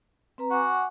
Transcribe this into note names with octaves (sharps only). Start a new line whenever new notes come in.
C4 B4 A#5
F#4 F#5 G#5 D6